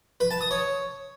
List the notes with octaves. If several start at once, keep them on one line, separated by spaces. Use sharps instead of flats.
B4
A5
D#6
C#5